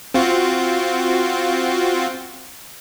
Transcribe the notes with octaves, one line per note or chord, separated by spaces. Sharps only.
C4 F4 F#4